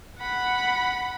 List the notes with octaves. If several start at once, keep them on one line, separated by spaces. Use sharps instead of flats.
F#5 B5